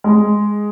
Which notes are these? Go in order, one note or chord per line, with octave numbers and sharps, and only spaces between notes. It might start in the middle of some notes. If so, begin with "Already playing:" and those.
G#3